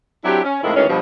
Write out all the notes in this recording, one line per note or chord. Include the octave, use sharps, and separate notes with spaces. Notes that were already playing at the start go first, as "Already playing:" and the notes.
F#3 C4 D4 E4 G4
C#4
F2 A2 D#3 F3 G#3 E4
D2 D#3 E3 G#3 C#4
G2 B2 F3